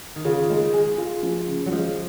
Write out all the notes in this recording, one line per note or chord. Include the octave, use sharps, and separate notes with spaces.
D#3
C#3 F4
D#3 G#3
G#3 G#4
F4
F3
C#3
F#3
F3 G#3